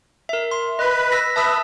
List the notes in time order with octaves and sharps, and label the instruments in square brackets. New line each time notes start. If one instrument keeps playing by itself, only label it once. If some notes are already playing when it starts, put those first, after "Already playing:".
[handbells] A#4 E5
C6
[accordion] B4 [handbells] D#5
[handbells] E6 A#6 B6
[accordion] B4 E5 B5 [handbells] A5 D#6 E6